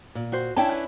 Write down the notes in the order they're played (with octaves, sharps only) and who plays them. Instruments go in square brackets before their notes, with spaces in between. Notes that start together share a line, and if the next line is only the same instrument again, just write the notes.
[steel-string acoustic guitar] A#2
[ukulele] F#4 C5
[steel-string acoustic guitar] C#4 D4 E4 [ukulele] G5 A5
[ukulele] B4